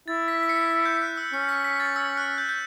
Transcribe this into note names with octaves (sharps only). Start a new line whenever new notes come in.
E4 A6
B6
B6
C#7
B6
G6
G6
F#6
E6
C#4 C#7
B6
B6
A6
E6
F#6
G6
G6